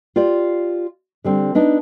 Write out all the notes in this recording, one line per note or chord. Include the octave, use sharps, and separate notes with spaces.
F4 G4 D5 F5
D3 G3 C4
B3 D4 D#4